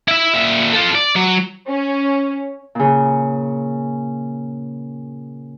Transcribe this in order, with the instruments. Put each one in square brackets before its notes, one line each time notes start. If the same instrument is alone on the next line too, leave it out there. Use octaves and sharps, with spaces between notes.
[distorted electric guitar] E4 E5
A#2 E5
F4 A4
D5
F#3
[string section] C#4
[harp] A#2 C#3